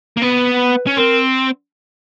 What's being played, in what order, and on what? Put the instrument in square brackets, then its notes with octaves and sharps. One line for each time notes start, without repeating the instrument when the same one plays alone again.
[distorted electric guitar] A#3
[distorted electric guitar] B3 [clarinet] B4
[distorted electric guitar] C#4
[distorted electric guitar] C4 [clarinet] A#4